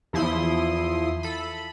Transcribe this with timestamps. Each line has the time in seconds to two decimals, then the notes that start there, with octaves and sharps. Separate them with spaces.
0.13 E2 F3 E4 C6 D#6
1.23 A4 B5